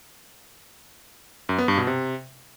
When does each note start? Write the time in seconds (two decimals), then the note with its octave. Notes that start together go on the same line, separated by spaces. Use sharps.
1.49 F#2
1.58 B3
1.68 G2
1.78 B2
1.87 C3